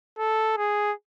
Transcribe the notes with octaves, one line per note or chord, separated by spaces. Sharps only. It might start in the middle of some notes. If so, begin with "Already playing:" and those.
A4
G#4